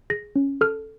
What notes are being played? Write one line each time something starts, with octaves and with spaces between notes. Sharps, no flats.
G#4 A#6
C#4
A4 F6